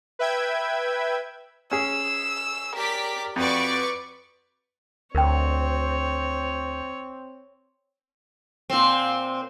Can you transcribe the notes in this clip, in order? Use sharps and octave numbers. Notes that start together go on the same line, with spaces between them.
B4 E5 G5 G#6
C#4 G#4 E6
G4 A#4 D5 B6
F2 F#4 B4 D5 C#6
D2 C4 A#4 C#5 G5
A#2 C4